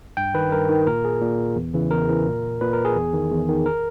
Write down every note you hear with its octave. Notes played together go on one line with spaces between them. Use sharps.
G2 G5
D#3 B4
G2 A#4
D#3
A#2 A#4
G#4
A#2
E2
C#3 E3
E2 A#4
C#3 E3
A#2
A#2 B4
A#4
G#4
E2
D#3
E2
D#3
A#4